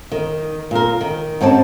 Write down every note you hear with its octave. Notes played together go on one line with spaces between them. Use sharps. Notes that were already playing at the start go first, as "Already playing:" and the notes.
D#3
A#2 A#4
D#3
G#2 C4 C#4 G4 A5